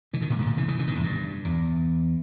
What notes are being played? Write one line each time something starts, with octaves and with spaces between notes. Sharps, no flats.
C#3 E3
B2 D#3
A#2 C#3
G#2 B2
A#2 C#3
C#3 E3
C#3 E3
C#3 E3
B2 D#3
E2 G#2
G2
E2